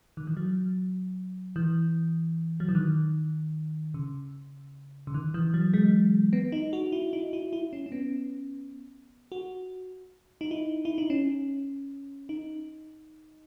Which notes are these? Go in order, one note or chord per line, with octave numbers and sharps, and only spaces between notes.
D#3
E3
F#3
E3
F#3
E3
D#3
C#3
C#3
D#3
E3
F#3
G#3
B3
D#4
F#4
E4
D#4
E4
E4
C#4
C#4
B3
F#4
D#4
E4
E4
D#4
C#4
D#4